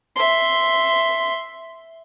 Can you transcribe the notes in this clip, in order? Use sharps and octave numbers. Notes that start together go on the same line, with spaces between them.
E5 C6